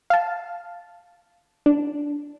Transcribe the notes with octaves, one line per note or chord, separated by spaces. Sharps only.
F5 A5
D4